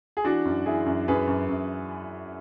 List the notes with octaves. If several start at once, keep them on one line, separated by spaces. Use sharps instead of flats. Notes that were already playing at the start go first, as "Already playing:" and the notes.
G#4
E3 D4 F#4
F#2
E3 E4 G#4
F#2
F#2 G#4 B4
F#2
F#2